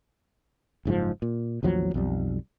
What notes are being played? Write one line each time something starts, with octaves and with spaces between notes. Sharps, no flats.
F#1 G#2 C3 F3
A#2
A1 D#2 F3 F#3
B1 F2 G3